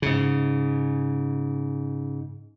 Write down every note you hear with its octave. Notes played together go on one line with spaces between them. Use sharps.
G#2 C#3